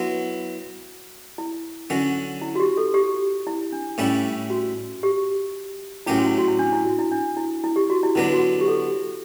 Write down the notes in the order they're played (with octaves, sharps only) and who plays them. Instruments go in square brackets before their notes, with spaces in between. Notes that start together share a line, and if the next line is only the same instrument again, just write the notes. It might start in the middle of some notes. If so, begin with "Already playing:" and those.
Already playing: [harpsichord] F#3 B3 E4 [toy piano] F#4
[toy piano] E4
[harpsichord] D3 F#3 C#4
[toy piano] E4
F#4
G4
A4
G4
E4
D4
[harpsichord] A2 G3 C#4 E4
[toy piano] F#4
G4
[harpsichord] A2 F#3 C#4 G4 [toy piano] E4
[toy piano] F#4
E4
F#4
E4
D4
E4
F#4
E4
D4
E4
E4
G4
F#4
E4
[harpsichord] D3 F#3 B3 D4 [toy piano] E4
[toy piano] F#4
G4
A4